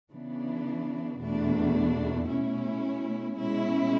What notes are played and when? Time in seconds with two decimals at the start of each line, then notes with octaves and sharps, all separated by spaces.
0.11 C#3 E3 B3 D4
1.20 E2 B2 A3 D4
2.28 B2 A3 C#4 E4
3.37 B2 G#3 C#4 E4